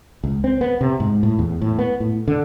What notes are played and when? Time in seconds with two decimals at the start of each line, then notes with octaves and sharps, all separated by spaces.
0.24 C#2
0.44 C4
0.61 B3
0.81 C3
1.00 G#2
1.23 A2
1.39 E2
1.62 A2
1.79 B3
2.00 A2
2.28 D3